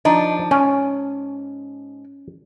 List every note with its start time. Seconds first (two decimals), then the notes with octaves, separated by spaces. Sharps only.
0.05 F3 D4 D#4
0.51 G#2 C#4